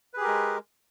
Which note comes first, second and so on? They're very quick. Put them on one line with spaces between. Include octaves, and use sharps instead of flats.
B4 G#4 G4 A#4 G#3